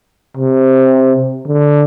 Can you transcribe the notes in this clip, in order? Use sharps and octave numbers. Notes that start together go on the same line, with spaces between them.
C3
D3